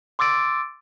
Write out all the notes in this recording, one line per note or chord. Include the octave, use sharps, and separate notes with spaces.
C6 D6 E6 A6 D7